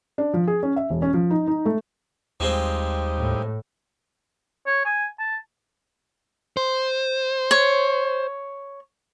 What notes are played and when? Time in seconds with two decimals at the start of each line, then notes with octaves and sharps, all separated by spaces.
0.18 D4
0.34 F3
0.47 G#4
0.63 C#4
0.76 E5
0.90 E1
1.02 C#4
1.14 F3
1.30 D#4
1.47 D#4
1.65 A3
2.40 D#2 F3 G3 G#3 C4 D#4 G4
3.17 A2
4.67 C#5
4.85 G#5
5.19 A5
6.57 C5
7.51 C#5